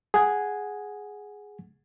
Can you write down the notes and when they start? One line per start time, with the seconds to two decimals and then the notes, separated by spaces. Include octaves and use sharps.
0.14 G#4 F#5 G#6